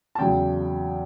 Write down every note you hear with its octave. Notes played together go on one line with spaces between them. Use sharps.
A5
E2 C#3 F#3 G5